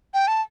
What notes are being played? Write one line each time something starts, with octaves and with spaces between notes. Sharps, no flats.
G5
A5